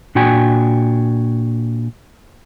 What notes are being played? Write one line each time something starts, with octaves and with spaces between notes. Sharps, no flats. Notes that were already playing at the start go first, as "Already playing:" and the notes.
A#2 D4 F#4 G5 G#5